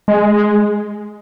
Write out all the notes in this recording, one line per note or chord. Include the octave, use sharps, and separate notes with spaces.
G#3